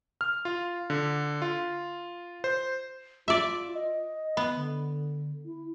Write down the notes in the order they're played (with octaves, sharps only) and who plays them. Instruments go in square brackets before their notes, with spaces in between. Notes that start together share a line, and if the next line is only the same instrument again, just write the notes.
[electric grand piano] F6
F4
D3
F4
C5
[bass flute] F4 [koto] D5 E5
[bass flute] D#5
[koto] B3
[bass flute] D3
E4